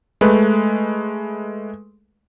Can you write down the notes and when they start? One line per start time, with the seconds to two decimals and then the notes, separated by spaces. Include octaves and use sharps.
0.21 G#3 A3 B4